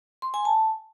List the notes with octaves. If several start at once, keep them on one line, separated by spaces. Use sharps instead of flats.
C6
G#5
A5